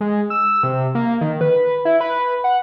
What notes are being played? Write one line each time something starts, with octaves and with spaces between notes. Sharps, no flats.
G#3
E6
C3
A#3
D#3
B4
E4
B4
F#5